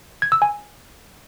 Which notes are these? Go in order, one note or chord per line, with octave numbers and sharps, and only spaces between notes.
G#6
E6
G#5